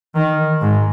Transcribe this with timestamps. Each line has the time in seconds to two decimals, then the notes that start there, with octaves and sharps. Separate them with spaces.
0.15 D#3
0.61 G#2